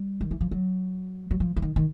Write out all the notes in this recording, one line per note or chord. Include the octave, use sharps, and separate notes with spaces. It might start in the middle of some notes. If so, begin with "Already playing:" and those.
Already playing: G3
D#3
E3
F3
F#3
F#3
F3
E3
D#3
D#3